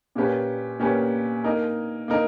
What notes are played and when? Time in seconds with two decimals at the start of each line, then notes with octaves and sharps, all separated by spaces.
0.15 A#2 A#3 C#4 G4 B4
0.79 A#2 A#3 C#4 G4 B4
1.44 A#3 D#4 A#4 D#5
2.08 A#3 D#4 A#4 D#5